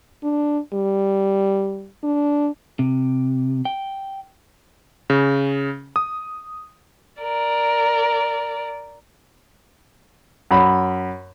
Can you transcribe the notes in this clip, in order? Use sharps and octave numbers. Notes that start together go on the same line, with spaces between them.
D4
G3
D4
C3
G5
C#3
D#6
A#4 D5
F#2 B5